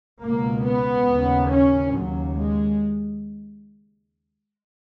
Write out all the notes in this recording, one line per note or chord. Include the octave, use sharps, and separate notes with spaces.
C#2 B2 A#3
B3
D#2 C#3
C#4
D#2 C#3 F#3
G#3